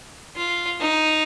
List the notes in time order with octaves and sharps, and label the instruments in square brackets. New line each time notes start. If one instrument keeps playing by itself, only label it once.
[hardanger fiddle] F4
D#4